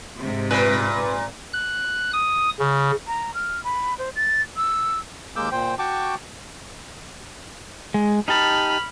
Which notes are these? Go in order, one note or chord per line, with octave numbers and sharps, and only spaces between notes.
G#2 C3
A#2 B4
F#6
D#6
C#3
A#5
F6
B5
C5
A6
E6
D#2 G#3 A#3 D6 E6 G6
A#2 C5 G5
F#4 G5 A5 C#6 D6
G#3
D#4 G4 A5 B5 F6